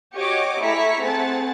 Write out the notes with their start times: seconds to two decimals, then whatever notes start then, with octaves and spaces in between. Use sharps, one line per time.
0.15 F#4 G4 C#5 D#5 C#6 D6
0.61 A3 E4 G#4 A#5 C#6 B6
1.03 A3 C4 G#4 F#5 A5 A6